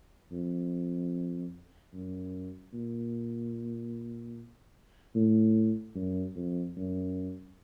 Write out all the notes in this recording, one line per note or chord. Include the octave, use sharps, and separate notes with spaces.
F2
F#2
A#2
A2
F#2
F2
F#2